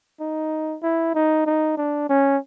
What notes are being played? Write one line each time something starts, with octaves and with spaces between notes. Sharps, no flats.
D#4
E4
D#4
D#4
D4
C#4